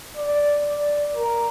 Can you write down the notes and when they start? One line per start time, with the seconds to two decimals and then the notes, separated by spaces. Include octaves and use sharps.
0.16 D5
0.65 D5
1.15 A#4